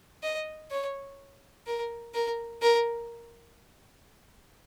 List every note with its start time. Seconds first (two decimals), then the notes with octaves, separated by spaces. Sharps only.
0.23 D#5
0.71 C#5
1.67 A#4
2.15 A#4
2.62 A#4